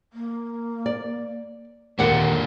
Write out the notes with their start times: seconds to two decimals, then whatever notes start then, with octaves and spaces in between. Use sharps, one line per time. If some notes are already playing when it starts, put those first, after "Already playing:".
0.13 A#3
0.86 D5
1.99 D#2 A#2 D3 A#3 A#4 D5 F#5